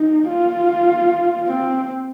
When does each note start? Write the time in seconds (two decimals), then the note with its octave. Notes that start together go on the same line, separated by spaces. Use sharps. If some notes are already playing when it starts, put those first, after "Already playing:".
Already playing: D#4
0.28 F4
1.47 C4